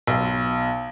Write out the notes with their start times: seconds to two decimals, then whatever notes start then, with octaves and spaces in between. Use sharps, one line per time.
0.07 B1